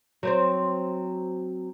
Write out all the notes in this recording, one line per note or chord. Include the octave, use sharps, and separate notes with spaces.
F#3 C4 C5